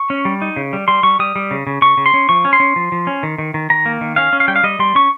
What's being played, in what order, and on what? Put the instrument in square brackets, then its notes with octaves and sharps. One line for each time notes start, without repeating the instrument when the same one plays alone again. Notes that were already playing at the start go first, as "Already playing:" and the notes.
Already playing: [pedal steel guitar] C#6
C#4
G3
D#4
C#3
G3
G3 C6
G3 C#6
G3 D#6
G3
C#3
C#3
C#3 C#6
C#3
C6
C#4
F3 C#6
C#4
C6
C#4
F3
F3
C#4
D#3
D#3
D#3
D#3 A#5
A#3
D#3
C#4 F5
C#4
F5
G3 G5
F5
G3 D#5
G3 C6
C#4 C#6